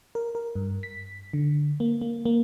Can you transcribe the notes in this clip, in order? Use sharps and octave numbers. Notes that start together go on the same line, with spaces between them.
A#4
A#4
G2
B6
D3
A#3
A#3
A#3